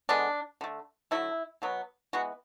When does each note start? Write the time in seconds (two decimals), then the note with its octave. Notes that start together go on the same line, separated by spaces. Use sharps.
0.09 D3 G#3 B3 D4
0.61 D3 A3
1.11 D3 F#3 A3 E4
1.62 B2 F#3 B3
2.13 E3 G#3 B3 F#4